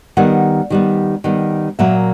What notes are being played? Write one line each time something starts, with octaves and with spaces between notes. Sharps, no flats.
D#3 G3 B3 F#5
D#3 G3 B3
D#3 G3 B3
A#2 F#3 A#3 E5